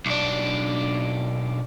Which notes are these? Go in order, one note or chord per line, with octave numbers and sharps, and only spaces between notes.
B1 D4